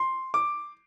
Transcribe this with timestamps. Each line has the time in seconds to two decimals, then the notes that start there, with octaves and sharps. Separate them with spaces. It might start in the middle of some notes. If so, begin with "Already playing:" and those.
Already playing: C6
0.34 D6